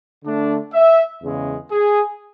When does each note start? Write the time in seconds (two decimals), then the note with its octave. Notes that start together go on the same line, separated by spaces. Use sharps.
0.23 D3 A3 D4
0.73 E5
1.22 E2 C#3 G#3
1.72 G#4